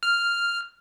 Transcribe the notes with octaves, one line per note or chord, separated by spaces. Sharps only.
F6